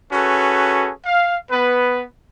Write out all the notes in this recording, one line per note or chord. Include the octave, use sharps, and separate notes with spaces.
C#4 F#4 G#4 A4 B4
F5
B3 B4